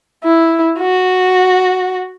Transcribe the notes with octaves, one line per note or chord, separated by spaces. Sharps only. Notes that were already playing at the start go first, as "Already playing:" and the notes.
E4
F#4